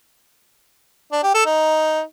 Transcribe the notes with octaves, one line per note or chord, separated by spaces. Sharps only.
D4
G4
A4
D#4